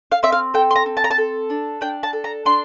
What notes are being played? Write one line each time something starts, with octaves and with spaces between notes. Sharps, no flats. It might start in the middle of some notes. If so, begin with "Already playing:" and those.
F5
C4 E5
F5
A4 G5
C6
A#5
C4
A5
A#5
A5
A4
D4
D4 G5
A5
A4
A#5
D4 C6